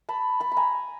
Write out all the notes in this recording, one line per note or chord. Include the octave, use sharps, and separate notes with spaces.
A5 B5
A5 B5
B5
G#5 A#5